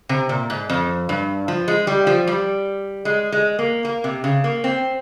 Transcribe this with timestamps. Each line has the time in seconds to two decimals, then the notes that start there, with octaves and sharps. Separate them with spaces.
0.09 C3
0.29 A#2
0.50 G#2
0.70 F2
1.09 G2
1.48 F3
1.68 G#3
1.87 G3
2.07 F3
2.27 G3
3.05 G#3
3.32 G#3
3.59 A#3
3.85 A#3
4.04 C3
4.24 C#3
4.44 A#3
4.64 C4